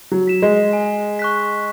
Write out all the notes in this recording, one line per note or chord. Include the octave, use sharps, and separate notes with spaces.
F#3
B6 E7
G#3
G#5
C#6 F#6 B6